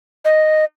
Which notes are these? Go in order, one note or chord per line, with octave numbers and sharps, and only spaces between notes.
D#5